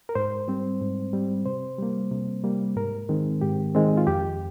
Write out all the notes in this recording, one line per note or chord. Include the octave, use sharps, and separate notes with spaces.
A#4
G#2 C5
G3 C4
G#2
G3 C4
C3 C5
G3 A#3
C3
G3 A#3
G#2 A#4
D#3 G#3 C4
G#2 G4
D#3 G#3 C4
F4
F2 G4